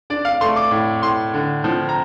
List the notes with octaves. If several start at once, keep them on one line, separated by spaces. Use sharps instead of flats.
D4 D5
F5
A3 C6
D6
A2
A2 C6
D3
F3
A#5